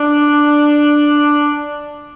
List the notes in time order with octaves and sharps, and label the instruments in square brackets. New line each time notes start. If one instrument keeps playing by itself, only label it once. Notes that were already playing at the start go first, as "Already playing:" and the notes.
Already playing: [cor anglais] D4